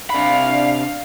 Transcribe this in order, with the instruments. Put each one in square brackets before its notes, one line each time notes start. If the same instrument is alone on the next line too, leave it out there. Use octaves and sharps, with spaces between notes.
[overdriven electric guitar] C3 B5 [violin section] D4 F5